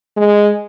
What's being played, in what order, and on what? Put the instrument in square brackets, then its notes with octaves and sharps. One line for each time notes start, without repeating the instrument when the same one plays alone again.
[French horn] G#3